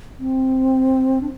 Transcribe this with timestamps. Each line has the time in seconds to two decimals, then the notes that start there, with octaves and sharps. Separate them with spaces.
0.19 C4
1.21 D4